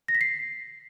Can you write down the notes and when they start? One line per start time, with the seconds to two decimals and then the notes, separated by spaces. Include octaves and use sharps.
0.08 A#6
0.15 B6
0.21 C7